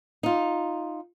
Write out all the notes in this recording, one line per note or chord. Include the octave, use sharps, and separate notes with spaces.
D#4 F4